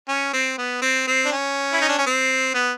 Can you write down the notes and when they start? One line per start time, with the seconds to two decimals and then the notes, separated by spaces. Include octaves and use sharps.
0.08 C#4
0.33 C4
0.58 B3
0.82 C4
1.07 C4
1.25 D4
1.32 C#4
1.73 E4
1.81 D#4
1.89 D4
1.98 C#4
2.06 C4
2.54 B3